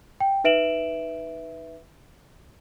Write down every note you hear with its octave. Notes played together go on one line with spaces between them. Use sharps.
G5
D#4 B4 E5 D7 E7 F#7